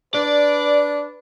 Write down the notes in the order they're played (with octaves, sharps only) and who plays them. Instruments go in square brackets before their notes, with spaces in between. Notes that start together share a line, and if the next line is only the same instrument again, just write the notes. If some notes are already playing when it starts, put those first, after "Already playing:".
[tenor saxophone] D4 [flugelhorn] B4 [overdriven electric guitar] D5